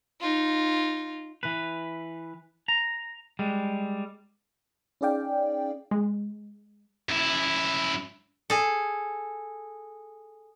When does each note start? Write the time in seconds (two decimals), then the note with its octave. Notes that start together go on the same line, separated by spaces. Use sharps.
0.21 D#4 F4
1.43 E3 B4
2.68 A#5
3.39 G3 G#3
5.01 C#4 D#4 G#4 D5 F5 G5
5.91 G#3
7.09 F#2 E4
8.50 G#4 A4